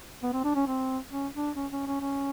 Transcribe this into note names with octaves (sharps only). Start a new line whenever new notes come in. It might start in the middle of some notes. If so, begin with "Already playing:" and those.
B3
C4
D4
C#4
C4
C#4
D4
C#4
C#4
C#4
C#4